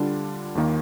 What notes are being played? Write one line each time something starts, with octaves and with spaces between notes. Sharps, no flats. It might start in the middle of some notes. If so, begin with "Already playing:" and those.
Already playing: D3 G3 D4 F4
D#2 D#3 A#3